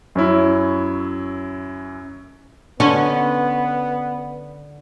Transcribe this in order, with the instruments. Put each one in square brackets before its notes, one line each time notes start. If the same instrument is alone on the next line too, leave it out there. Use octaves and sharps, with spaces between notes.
[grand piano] F#2 C#4 E4
[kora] D3 [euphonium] B3 [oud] C#4